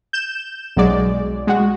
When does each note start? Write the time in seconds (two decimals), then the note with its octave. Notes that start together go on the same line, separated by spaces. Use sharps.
0.13 G6 E7
0.76 B1 F#3 G#3 D5
1.47 G#3 F#4